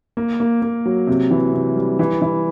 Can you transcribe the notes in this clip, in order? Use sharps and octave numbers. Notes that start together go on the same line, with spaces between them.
A#3
A#3
A#3
F#3
C3
E3
C3
G3
E3
E3